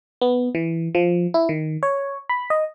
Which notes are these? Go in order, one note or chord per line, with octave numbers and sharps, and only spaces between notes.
B3
E3
F3
E4
D#3
C#5
B5
D#5